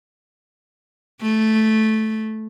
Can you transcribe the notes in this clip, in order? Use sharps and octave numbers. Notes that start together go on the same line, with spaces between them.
A3